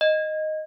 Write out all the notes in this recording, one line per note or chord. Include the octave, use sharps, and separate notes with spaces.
D#5